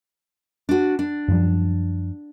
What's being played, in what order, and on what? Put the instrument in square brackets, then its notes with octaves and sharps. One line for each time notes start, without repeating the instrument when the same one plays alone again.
[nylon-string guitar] D4 F#4
D4
[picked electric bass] F#2 F3 G3